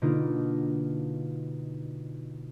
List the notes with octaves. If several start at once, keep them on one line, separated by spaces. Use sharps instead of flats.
B2 D3 A#3 D4 D#4 F4